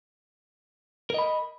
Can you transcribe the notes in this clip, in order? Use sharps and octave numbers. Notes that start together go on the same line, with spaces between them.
A#4 D#5 B5